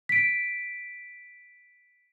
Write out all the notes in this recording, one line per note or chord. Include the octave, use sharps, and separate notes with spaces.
B6 D7